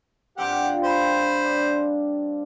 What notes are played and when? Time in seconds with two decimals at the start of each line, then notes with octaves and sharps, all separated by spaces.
0.38 G2 C4 G4 A#4 F#5
0.63 F4
0.83 C5 G5 A#5 B5
1.45 D4